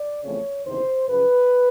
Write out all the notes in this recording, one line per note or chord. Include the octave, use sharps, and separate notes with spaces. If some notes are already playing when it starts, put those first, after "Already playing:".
Already playing: D5
E2 C#3 F3 A3 C4 C#5
F#1 E2 C3 D#3 C5
F#2 C#3 F3 B4